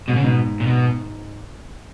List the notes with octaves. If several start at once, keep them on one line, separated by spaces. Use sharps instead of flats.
G#2 B2
C#3
G#2 B2
A#2
B2